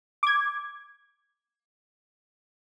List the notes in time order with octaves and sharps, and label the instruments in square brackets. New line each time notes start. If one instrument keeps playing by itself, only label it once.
[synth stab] D6 G#6